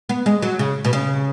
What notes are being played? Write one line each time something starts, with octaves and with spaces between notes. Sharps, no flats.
B3
G#3
F#3
C#3
B2
C#3